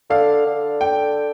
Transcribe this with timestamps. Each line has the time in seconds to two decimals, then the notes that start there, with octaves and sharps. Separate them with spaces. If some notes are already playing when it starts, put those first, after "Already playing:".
0.10 D3 F5
0.46 D3
0.81 G5